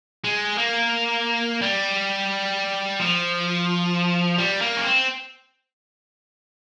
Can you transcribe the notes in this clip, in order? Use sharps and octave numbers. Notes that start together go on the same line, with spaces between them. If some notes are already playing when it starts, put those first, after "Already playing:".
G#3
A#3
G3
F3
G3
A#3
C#4
C4